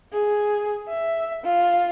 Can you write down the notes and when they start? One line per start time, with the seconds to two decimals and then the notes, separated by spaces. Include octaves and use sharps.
0.13 G#4
0.89 E5
1.44 F4